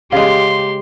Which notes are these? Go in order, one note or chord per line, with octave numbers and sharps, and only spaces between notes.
C#3 G#3 G4 F5 C6